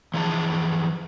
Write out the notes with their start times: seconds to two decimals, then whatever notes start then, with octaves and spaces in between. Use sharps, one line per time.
0.14 E3 F3 G#4 E5 A5